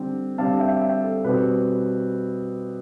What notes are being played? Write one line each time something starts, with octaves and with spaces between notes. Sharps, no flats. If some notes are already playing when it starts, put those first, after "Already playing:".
Already playing: D3 G3 C4 G5
D3 G3 C4 F5 A5
E5 G5
E5 G5
A4
B2 G3 C4 B4